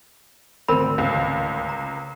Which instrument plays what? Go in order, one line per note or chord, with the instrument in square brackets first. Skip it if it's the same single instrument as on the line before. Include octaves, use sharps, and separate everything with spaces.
[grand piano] G#1 D2 [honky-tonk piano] C4 [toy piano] A#4 B5
[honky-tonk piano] C#2
[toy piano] A#5